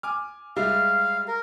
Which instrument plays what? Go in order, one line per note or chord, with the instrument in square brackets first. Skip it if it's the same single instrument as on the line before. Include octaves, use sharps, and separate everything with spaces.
[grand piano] G#5 D6 F6
[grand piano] G3 G#3 E5 [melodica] F5
[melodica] A#4